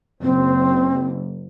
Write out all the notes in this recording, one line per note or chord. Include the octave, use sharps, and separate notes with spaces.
F#1 C4